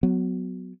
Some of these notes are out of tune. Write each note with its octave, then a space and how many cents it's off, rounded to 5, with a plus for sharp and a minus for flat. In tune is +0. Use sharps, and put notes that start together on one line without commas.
F#3 +0 B3 +20